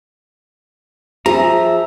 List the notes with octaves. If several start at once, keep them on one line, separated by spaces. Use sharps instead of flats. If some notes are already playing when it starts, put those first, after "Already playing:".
F3 G#4 E5 A#5